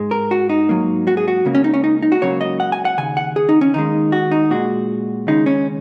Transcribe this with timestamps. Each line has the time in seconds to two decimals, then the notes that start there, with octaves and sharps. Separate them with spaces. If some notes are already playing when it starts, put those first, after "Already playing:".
Already playing: G#2 G#3
0.11 A#4
0.31 F#4
0.49 D#4
0.69 G#2 F#3 A#3
1.07 F#4
1.17 G#4
1.28 F#4
1.45 C#2 C#3 A#3
1.55 C#4
1.64 D#4
1.74 C#4
1.84 D#4
2.02 D#4
2.12 F#4
2.21 C#2 C#3 F#3 A#3 C#5
2.41 D#5
2.60 F#5
2.72 G#5
2.85 F#5
2.98 D#2 C#3 G#5
3.17 F#5
3.36 G#4
3.49 D#4
3.61 C#4
3.74 D#2 D#3 G#3 D#4
4.12 F#4
4.31 D#4
4.51 A#2 G#3 F#4
5.27 D#2 C#3 G#3 D#4
5.46 C#4